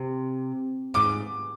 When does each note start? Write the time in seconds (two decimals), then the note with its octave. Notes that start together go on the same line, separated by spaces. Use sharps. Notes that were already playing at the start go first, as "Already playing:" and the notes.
Already playing: C3
0.94 G#2 D6